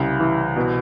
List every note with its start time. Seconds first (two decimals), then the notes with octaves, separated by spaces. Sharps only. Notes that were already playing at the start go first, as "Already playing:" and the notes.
Already playing: C2 C#3
0.20 E3
0.56 B2